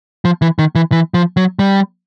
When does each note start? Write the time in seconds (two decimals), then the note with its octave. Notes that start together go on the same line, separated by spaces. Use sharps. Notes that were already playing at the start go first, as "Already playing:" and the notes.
0.25 F3
0.42 E3
0.59 D#3
0.75 E3
0.92 E3
1.14 F3
1.37 F#3
1.59 G3